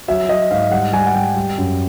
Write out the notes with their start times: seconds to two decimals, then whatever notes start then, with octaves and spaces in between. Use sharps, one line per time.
0.08 F#3 E5
0.29 F#3 D#5
0.50 G#2 F5
0.72 G3 F#5
0.93 G3 G#5
1.06 F#5
1.14 G3 G5
1.36 G3
1.58 F#2